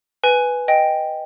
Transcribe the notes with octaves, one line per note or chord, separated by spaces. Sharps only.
B4 G#5
D#5 G5